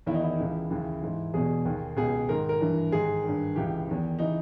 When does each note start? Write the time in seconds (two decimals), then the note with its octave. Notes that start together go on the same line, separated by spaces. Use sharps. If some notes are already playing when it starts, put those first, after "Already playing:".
0.06 E2 D#3 E4
0.14 D#4
0.23 E4
0.39 C#2 C#3 E3
0.70 D#2 C#3 E3
1.01 G#2 E3
1.34 E2 B2 G#4
1.65 D#2 D#3
1.97 C#2 B2 G#4
2.29 G#2 D#3 A#4
2.49 A#4
2.61 G2 E3
2.92 G#2 D#3 G#4
3.24 G2 D#3
3.56 C#2 C#3 E3 G4
3.88 E2 D#3
4.19 C#3 E3 D#4